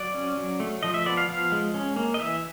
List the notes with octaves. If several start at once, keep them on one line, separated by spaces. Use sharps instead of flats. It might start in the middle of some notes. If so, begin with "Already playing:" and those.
Already playing: F#3 D5
C#4
F#3
A3
F3 D#5
E5
B3 D5
F5
F3 F5
G#3
C#4
A#3
D#5
E3 E5